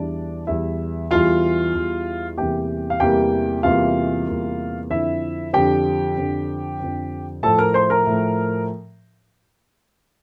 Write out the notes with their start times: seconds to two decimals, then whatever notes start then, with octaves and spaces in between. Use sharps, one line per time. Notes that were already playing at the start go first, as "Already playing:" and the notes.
Already playing: E2 E3 G3 D4 D5
0.47 E2 E3 G3 E4 E5
1.11 E2 E3 G3 F4 F5
1.74 E2 E3 G3
2.37 E2 C3 E3 G3 A#3 G4 G5
2.90 F5
3.00 E2 C3 E3 G3 A#3 G4 G5
3.63 E2 C3 E3 G3 A#3 F4 F5
4.28 E2 C3 E3 G3 A#3
4.90 F2 D3 F3 E4 E5
5.53 F2 D3 F3 G4 G5
6.17 F2 D3 F3
6.80 F2 D3 F3
7.43 A2 F3 A3 A4 A5
7.59 A#4 A#5
7.74 C5 C6
7.90 A#4 A#5
8.07 A2 F3 A3